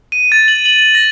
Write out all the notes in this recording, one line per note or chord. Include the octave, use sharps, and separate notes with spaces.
D#7
A6
F#7
F#7
A#6